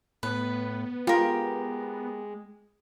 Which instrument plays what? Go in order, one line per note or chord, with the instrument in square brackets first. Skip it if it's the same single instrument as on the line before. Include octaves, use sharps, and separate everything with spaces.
[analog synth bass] A2 [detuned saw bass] B3 [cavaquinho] B4
[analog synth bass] G#3 [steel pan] F4 [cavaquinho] G4 A#4